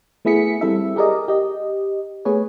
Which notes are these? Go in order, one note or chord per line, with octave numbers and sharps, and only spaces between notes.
A3 B3 E4 G#4 B6 C#7
G3 C4 E4 A4 E5
G4 G#4 A#4 D5 D#5
G4 D#5
A3 B3 G#4 B4 C#5